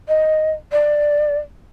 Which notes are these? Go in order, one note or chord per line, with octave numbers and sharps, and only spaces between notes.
D#5
D5